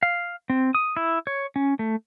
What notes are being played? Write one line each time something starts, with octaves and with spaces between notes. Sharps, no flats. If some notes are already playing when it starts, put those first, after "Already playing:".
F5
C4
D#6
E4
C#5
C#4
A3